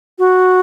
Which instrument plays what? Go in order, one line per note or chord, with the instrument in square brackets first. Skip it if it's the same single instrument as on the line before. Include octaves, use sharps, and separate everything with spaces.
[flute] F#4